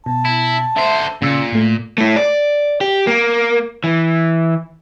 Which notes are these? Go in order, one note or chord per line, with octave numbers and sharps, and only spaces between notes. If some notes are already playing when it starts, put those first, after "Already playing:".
B2 A5
E4
D3 C5 E5
A#2 C#3 E6 C#7
A2 A3
A3 E4
D5
G4
A#3
E3